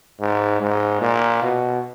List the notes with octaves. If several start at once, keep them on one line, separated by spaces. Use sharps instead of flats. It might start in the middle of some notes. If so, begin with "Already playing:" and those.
G#2
G#2
A#2
B2